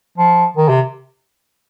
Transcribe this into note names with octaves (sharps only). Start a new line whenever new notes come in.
F3
D#3
C3